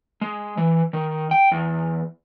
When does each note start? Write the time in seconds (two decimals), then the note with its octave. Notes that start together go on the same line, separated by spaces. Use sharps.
0.21 G#3
0.57 E3
0.93 D#3
1.31 G5
1.52 E2